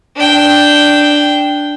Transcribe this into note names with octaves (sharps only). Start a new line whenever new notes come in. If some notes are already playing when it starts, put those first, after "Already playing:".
D4 G5